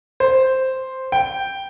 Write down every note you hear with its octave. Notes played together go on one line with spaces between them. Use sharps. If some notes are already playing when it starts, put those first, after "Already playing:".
C5
G5